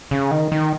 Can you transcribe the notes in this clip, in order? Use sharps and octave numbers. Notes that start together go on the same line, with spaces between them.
C#3
D#3
D#3